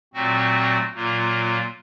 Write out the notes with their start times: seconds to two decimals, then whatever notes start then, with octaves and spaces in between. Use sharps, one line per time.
0.14 A#2 F#3 A3 C4 F#4
0.94 A#2 F#3 A#3 F4